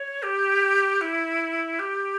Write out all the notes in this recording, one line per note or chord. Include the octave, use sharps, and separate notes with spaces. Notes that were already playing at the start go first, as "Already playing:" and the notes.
Already playing: C#5
G4
E4
G4